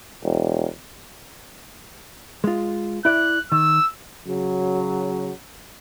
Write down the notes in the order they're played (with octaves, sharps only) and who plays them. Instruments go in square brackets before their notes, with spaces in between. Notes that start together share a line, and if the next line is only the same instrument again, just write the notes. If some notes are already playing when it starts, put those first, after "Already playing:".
[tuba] E1
[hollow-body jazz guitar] G#3 F4
[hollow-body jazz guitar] E4 D5 [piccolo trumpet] F#6
[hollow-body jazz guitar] D#3 [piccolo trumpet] E6
[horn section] C#3 F#3